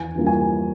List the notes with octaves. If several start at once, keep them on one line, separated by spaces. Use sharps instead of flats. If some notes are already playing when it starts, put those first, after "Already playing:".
Already playing: E2 G#5
E3 G3 A#3 F4
G#5